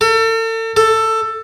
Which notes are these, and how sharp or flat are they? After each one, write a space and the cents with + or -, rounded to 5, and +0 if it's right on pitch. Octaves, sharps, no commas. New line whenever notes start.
A4 +40
A4 +15